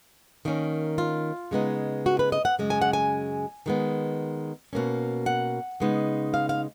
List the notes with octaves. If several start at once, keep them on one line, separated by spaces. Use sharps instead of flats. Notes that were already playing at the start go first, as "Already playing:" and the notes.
D#3 A#3 C#4
F4
C#3 G#3 B3 D#4
F#4
B4
D#5
F#5
F#2 C#3 G#3
G#5
F#5
G#5
D#3 G#3 B3
B2 A#3 C#4
F#5
C#3 G#3 B3 D#4
F5
F5